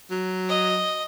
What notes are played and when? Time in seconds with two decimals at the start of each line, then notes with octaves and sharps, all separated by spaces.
0.11 F#3
0.49 D#5